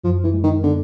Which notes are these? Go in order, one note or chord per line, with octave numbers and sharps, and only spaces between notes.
F#2 F3
E3
G#3
D#3
D3 B3